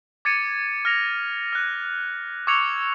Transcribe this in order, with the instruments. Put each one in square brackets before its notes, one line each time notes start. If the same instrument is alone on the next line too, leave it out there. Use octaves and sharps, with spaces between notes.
[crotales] D6 G#6 A6 C#7 D#7
F6 A#6 F7
F6 F#6
C#6 D6 E6 G#6 C#7 F7